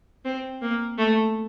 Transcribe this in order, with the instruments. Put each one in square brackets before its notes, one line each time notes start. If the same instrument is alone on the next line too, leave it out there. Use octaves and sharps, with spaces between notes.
[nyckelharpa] C4
A#3
A3